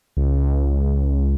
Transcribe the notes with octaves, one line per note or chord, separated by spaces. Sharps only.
C#2